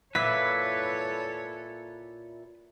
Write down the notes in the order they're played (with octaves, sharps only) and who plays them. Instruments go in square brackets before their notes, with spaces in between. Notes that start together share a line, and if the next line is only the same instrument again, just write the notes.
[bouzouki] A#2 E4 [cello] A4 C#5 [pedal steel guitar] B4 [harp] B6